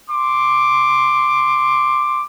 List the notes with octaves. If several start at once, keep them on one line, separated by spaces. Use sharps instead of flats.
C6 D6